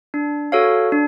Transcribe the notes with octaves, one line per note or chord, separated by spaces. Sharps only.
D4
F#4 A4 C#5 F5
D4